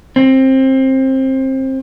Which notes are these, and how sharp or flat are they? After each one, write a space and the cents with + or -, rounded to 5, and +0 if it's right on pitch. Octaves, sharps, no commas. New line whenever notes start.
C4 +20